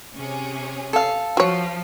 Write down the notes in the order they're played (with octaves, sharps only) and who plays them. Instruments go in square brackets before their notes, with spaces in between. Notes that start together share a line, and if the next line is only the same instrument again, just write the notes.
[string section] C3 C#4 G#4
[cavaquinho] A4 F5
[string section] F3 [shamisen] F#4 C#5